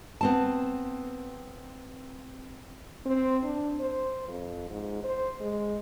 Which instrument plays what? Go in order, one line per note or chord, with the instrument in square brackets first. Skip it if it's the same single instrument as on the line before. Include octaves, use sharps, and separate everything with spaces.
[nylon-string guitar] B3 C4 A5
[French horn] C4
D4
C5
F2
G#2
C5
G#3